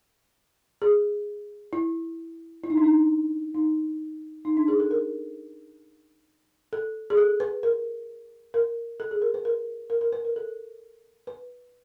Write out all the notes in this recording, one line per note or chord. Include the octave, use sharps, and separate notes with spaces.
G#4
E4
E4
D#4
D4
D#4
D#4
D#4
D4
G#4
A4
A#4
A4
G#4
A4
B4
A#4
A#4
A4
G#4
A#4
B4
A#4
A#4
A#4
B4
A#4
A4
B4